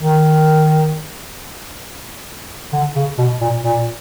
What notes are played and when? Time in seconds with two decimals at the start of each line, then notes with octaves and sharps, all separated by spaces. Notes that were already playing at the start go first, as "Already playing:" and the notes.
0.01 D#3
2.72 D3
2.95 C#3
3.18 B2
3.41 A#2
3.63 A#2